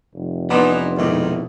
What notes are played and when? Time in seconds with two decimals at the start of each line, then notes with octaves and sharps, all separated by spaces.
0.15 F1
0.50 E3 B3 D4 D#4 C6 D6 D#6
0.97 F2 G#2 B2 D#3 E4 D6